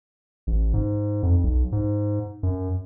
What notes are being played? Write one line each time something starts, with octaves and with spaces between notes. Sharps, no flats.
A1
G#2
F2
B1
G#2
F#2